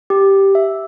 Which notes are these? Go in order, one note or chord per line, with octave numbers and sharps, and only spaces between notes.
G4
E5